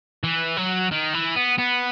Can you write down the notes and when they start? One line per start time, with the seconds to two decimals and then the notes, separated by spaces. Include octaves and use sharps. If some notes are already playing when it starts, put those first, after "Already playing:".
0.24 E3
0.57 F#3
0.91 D#3
1.13 E3
1.36 B3
1.58 B3